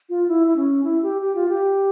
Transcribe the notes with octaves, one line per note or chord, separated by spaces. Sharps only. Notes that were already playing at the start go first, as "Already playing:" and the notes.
F4
E4
E4
C#4
E4
G4
G4
F4
G4